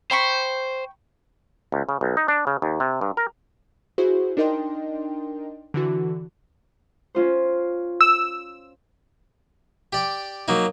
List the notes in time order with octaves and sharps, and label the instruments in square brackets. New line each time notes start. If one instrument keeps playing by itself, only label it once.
[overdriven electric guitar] C5 [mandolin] G5 B5 C#6
[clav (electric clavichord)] C#2
C#3
B1
D#4
D4
C#3
D#2
C3
G2
A#4
[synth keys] E4 F#4 G#4 C5
D4 D#4 A#4 D#5 G5 C6
D3 E3 F#4
[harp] C#4 F4 C5
[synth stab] E6
[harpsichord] G4 D5
F#3 A#3 D#4